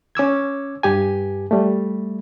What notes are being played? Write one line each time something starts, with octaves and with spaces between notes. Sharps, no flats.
C#4 D6 E6 G#6
G2 G4 G#5
G3 A3